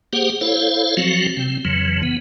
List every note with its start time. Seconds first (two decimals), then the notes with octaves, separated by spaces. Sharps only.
0.13 A#3 G4 G#4 C5 F#5
0.41 E4 A4 C5 C#5 F5
0.97 F3 F#3 C4 F#4
1.37 C3 C4
1.65 F2 C#3 E3 F#3
2.03 B3